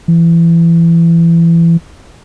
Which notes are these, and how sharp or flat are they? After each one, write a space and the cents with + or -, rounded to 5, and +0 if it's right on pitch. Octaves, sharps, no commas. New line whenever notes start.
E3 +25